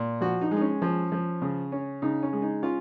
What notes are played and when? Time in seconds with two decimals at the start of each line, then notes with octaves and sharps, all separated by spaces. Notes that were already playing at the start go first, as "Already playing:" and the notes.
Already playing: A#2
0.21 F3 F#4
0.41 D#4
0.51 G#3
0.57 D#4
0.61 C#4
0.82 F3
1.12 F3
1.42 C#3
1.72 C#4
2.02 C#3 D#4
2.23 C#4
2.33 G#3
2.42 D#4
2.63 C#4 F4